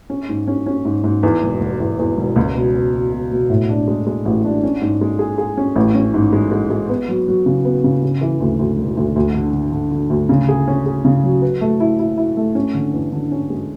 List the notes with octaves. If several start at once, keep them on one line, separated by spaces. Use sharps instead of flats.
C#4
G#2
C#4
C#4
G#2
G#2
E2
E1
E1
E2
E2
E1
C#2
B2
B2
B2
B2
B2
A2
D4
G#3
G#3
A1
D4
C#4
G#2
G#3
G#4
G#4
C#4
A1
C#4
G#2
G#3
G#3
G#3
B3
F#3
F#3
C#3
B3
C#3
C#3
E3
D2
D2
E1
D2
D2
D3
D3
D3
D3
D2
C#3
G#4
C#4
G#4
C#3
F#3
B4
A3
E4
E4
E4
A3
C#4
D3
E2
D3
C#4
G#3